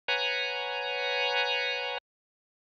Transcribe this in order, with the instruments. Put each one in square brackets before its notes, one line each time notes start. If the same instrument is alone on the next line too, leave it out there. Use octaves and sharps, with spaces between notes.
[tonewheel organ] B4 C#5 F#5 G#5 A#5